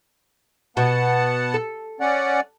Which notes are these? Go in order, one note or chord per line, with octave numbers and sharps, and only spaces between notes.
B2 B3 F#5 A5
A4
C#4 D5 F#5